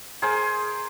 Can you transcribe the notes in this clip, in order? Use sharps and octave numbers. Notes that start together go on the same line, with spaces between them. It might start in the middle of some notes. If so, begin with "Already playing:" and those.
G#4 A#4 C5 G#5